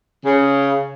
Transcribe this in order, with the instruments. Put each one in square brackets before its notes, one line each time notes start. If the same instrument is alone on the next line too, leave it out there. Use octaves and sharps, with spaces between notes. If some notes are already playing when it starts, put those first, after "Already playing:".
[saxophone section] C#3